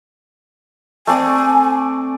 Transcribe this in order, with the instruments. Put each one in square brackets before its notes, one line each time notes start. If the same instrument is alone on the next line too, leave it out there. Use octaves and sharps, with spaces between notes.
[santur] A3 C4 D5 [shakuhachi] G#5